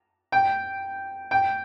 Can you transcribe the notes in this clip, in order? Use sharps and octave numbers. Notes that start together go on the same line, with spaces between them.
G5
G5